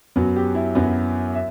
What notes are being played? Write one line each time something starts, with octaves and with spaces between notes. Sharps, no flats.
F#2 F#3 B3 F#4
G4
E4
F#2 F#3 B3 F#4
E5